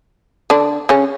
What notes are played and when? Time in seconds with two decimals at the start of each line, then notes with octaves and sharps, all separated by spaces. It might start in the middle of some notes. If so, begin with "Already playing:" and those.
0.50 D3 D4
0.89 C#3 C#4